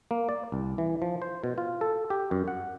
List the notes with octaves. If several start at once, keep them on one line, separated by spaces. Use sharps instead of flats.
A#3
D5
C2
E3
F3
C5
B2
F4
A4
G4
F#2
F#5